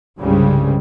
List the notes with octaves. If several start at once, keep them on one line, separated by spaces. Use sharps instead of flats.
C2 G2 C#3 G3 G#3